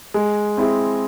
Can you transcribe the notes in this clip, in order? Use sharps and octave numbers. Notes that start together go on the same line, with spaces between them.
G#3
C4 E4 G#4